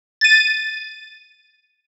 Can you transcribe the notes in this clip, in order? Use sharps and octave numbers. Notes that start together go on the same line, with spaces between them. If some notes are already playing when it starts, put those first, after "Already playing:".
A6 D#7